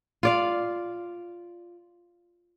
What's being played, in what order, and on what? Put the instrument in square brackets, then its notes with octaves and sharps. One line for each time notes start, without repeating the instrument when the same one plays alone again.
[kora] F4 D5 F5